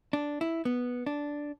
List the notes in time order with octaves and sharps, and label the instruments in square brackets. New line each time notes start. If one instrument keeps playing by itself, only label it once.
[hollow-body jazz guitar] D4
E4
B3
D4